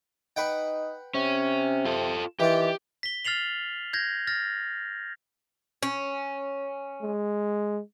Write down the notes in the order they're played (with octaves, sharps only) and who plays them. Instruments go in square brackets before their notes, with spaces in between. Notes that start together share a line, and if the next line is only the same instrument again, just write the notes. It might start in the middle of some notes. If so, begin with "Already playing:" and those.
[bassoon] D#4 [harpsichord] B4 F#5 G5
[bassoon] C3 [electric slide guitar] C#4
[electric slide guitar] F4 A4
[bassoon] D#3 [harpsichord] E3 F4 [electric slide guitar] G4
[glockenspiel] B6 G7
F6 A6 C7 F7 F#7
G6 G#6 A#6
F6 A6 A#6
[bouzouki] C#4
[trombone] G#3